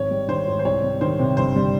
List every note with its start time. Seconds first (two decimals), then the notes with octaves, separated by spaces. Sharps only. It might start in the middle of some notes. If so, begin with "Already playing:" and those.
Already playing: G#1 G#2 C#5
0.11 G3
0.28 D#3 C5
0.47 G#2
0.59 C5
0.65 C2 C#5
0.83 G3
1.01 D#3 C5
1.19 C3
1.37 G1 C5
1.56 G3